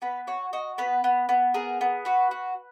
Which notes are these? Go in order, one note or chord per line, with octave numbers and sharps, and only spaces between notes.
B3 B4
F#4 C#5
F#4 D#5
B3 B4
B3
B3
G#4 A#4
B3
F#4 B4
F#4